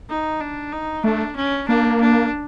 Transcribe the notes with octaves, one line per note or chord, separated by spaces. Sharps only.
D#4
D4
D#4
A3 D4
C#4
A#3 D4
D4